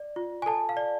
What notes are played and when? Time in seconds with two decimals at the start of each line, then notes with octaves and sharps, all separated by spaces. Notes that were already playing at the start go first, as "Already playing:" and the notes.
Already playing: D5
0.16 F4
0.42 G#5
0.46 A4 A5
0.69 F5
0.77 D5